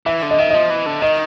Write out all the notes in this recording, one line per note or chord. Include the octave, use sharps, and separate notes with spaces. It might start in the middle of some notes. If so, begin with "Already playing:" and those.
E3 E5
D3
D#5
D#3 E5
F3 D#5
E3
D3
D#3 D#5